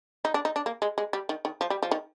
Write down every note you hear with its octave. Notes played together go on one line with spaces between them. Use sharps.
D#4
D4
D#4
D4
A#3
G#3
G#3
G3
D#3
D#3
F3
G3
F3
D#3